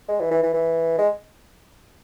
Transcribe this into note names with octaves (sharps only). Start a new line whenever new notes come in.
G#3
E3
E3
E3
E3
G#3